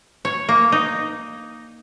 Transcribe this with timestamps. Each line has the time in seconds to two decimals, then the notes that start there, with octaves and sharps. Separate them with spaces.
0.25 C#5
0.49 A#3
0.72 D#4